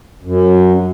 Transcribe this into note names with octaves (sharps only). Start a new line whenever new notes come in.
F#2